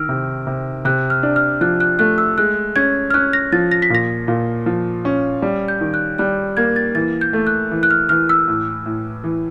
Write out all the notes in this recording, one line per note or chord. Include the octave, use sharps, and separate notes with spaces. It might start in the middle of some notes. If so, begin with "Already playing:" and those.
Already playing: D#3 E6 F6
C3
C3
C3 F#6
F6
D4
F6
F3 F#6
F#6
A3 F#6
E6
G#3 F#6
C#4 G#6
F6
C#4 F#6
A#6
F3 A6
A#6
B6
A#2 A#6
A#2
F3
C#4
G3
G6
D#3
F#6
G3 F#6
A#3 G#6
A6
E3 A6
G6
A3
F#6
E3
F#6
F6
E3 F6
E6
A2
A2
E3